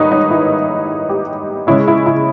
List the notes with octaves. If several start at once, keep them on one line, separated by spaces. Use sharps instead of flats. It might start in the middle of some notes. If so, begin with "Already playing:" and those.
Already playing: G#2 D#3 G3 D#4 B4 C#5 D#5
D#4
E4
G4
C#3 G#3 C#4 E4
E4
E4